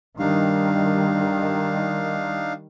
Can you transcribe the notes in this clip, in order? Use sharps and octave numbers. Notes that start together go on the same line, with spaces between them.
G2 D#3 G3 D4 D#4 F5